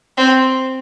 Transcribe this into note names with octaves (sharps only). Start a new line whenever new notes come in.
C4